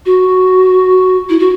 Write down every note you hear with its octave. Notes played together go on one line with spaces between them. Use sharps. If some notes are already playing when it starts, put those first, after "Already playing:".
F#4
E4
F#4